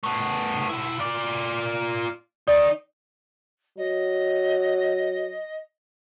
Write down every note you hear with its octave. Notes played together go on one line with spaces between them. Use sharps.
A3 B3
B1 E4
F4 D5
D#3 D#4 D5
F#3 D#5